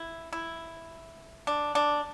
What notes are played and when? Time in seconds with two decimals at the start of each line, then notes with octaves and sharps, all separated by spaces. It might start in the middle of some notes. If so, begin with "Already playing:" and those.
Already playing: E4
0.33 E4
1.47 D4
1.75 D4